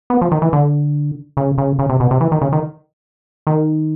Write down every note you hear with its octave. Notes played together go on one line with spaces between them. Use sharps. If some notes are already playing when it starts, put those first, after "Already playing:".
B3
F3
D#3
E3
D3
C#3
C#3
C#3
C3
B2
C3
E3
D#3
C#3
D#3
D#3